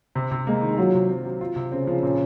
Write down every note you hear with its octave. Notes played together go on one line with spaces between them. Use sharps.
C3
C3
G#3 A#3
D#3
F#3 F4
C3
C4
F#3
F4
C3
C#3 C4
F3
A#2